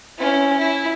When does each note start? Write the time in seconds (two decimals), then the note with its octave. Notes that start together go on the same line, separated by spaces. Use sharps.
0.18 C#4 E4
0.58 E4